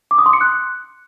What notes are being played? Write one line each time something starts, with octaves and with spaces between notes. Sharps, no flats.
D6
D#6
C6
C#7
F#6